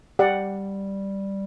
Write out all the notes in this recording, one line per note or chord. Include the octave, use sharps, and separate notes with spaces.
G3 G4 D5 F#5